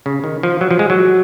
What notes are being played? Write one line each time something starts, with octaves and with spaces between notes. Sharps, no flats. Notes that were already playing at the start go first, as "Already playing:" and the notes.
C#3
D#3
F3
F#3
F3
G#3
F#3